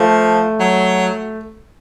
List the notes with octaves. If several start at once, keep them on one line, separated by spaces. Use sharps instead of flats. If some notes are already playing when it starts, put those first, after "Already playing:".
Already playing: F3 A3
F#3